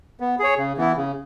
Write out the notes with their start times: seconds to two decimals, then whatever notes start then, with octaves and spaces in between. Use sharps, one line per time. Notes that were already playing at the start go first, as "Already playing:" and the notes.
0.20 B3
0.39 G#4 C#5
0.58 C#3
0.77 E3 B3 E4
0.97 C#3